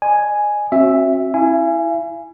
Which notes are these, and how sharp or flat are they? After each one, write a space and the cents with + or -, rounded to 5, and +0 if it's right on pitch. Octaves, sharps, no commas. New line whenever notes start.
D#5 -45 G#5 +0
C4 +45 F#4 -15 E5 +0
E4 +0 E5 +45 G#5 +0